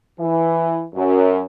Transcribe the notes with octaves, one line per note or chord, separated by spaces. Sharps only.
E3
F#2